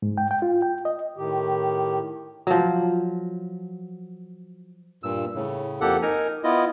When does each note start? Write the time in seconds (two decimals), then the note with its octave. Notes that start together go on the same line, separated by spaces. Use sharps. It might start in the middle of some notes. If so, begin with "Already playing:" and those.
0.02 G#2
0.18 G5
0.31 G5
0.42 F4
0.62 G5
0.85 D#5
1.16 A2 D#3 G4
2.47 F3 F#3
5.03 G2 A#2 E6
5.35 A2 C#3
5.81 F2 A#3 G4 A4 F#5
6.02 D#4 A#4 G#5 A#5
6.44 B3 E4 F4 D#5